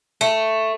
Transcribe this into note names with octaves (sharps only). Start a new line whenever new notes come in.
A3